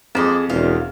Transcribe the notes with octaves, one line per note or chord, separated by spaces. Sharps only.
F2 G#4 C5 D5 D#5
E1 E2 F4 F5